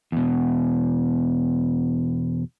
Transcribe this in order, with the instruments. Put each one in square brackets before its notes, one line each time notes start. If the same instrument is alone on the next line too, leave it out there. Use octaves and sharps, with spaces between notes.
[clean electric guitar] E2 B2